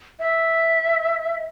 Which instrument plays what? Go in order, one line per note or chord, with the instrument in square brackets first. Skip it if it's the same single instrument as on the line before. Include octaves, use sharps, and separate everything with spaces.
[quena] E5